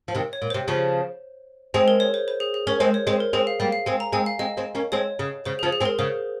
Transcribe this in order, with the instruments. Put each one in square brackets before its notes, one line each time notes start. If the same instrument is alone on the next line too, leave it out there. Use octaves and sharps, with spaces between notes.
[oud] F3
C3 D#3
[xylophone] C#5
[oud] A#2
[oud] C3 [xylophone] C5
[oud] C#3 F3
[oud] G#3 C4 [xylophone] G#4
[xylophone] A#4
C#5
C5
C5
G#4
G#4
[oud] C#4 [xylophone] A#4
[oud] G#3 C4 [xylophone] C5
[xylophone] C#5
[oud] G#3 C4 [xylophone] C5
[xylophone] A#4
[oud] G#3 C4 [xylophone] G#4
[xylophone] F5
[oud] G3 A#3 [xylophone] F5
[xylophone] F5
[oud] G#3 C4 [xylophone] G#5
[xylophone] A#5
[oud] G#3 C4 [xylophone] G#5
[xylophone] F5
[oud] G#3 C4 [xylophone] D#5
[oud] G#3 C4
A#3 C#4
[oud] G#3 C4 [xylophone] C#5
[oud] C#3
[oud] C#3 [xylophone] C5
[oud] C#3 F3 [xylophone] G#4
[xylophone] G#4
[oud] G#3 C4
[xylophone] A#4
[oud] C#3 [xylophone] C5